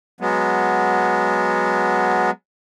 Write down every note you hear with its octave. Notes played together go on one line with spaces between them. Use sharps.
F#3 G#3 B3